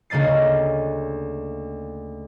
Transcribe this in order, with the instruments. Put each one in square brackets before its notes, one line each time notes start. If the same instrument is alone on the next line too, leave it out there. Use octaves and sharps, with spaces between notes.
[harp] D2 C#3 A#3 D#5 A6 C7